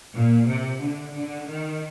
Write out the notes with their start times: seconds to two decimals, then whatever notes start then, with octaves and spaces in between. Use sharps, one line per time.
0.14 A#2
0.48 C3
0.82 D3
1.15 D3
1.49 D#3